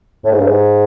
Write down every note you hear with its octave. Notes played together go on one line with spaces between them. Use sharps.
A2
G#2
G2
G#2